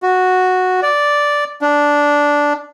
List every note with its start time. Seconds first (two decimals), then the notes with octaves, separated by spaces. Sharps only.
0.03 F#4
0.82 D5
1.61 D4